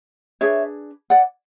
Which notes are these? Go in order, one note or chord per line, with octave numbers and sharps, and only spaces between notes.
D4 G#4 B4 C#5 E5
D5 F#5